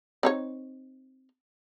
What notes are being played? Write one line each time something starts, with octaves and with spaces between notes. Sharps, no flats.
C4 D#4 C#5